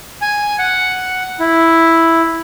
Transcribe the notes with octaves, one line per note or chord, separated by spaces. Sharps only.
G#5
F#5
E4